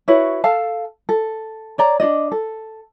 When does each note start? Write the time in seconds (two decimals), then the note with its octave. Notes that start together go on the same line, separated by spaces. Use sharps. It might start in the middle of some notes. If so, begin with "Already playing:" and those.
0.08 E4 F#4 B4 C#5
0.44 A4 F5 A5
1.09 A4
1.78 C#5 D5 A#5
2.00 D4 F#4 D5 D#5
2.32 A4